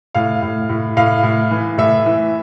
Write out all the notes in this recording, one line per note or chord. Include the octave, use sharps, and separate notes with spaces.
A2 F5
A2
A2
A2 F5
A2
E3
A2 E5
E3